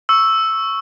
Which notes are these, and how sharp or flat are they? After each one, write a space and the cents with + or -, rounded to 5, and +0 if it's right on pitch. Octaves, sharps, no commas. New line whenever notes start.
C#6 +0 E6 +0